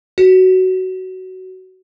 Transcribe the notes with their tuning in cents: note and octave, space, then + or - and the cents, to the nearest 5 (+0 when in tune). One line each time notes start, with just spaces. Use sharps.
F#4 +15